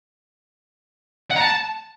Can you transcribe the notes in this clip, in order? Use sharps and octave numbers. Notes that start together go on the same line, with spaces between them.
F#5
A#5
A5